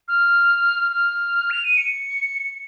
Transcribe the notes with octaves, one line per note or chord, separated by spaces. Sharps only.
F6
F6
F7
D#7
C#7